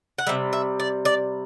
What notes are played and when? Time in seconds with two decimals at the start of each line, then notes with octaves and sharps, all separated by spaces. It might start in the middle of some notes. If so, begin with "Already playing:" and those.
0.18 F#5
0.27 C3 G3 E5
0.53 E5
0.80 D5
1.05 D5